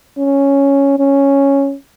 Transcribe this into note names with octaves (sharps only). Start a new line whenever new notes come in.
C#4
C#4